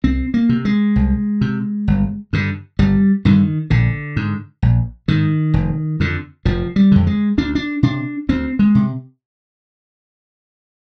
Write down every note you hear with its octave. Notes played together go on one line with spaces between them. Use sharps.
C2 C4
A#3
C3
G#3
C2
C3
G1
G2 D3
G1 G3
G2 D3 D#3
A#1 D3
G#2
A#1
G#2 D#3
F1
F2 D3
F1 F3
G3
F2 D3
G#3
D2 D4
D4
C3 D4
D2 C4
G#3
C3